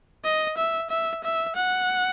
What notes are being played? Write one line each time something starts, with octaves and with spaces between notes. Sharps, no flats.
D#5
E5
E5
E5
F#5